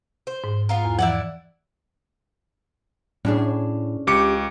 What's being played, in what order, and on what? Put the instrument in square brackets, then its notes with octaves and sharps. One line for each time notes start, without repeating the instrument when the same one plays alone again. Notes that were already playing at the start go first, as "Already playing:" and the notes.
[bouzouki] C5
[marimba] G#2
[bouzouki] B3 F4 A#4
[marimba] E2
[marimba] E3 F3 [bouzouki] E4 D5 F#5
[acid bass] A2 [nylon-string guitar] C#4 D4 G#4
[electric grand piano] C#2 D6 C#7 [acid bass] G4